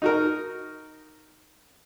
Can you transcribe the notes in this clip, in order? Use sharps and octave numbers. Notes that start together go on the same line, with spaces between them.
D#4 F#4 A#4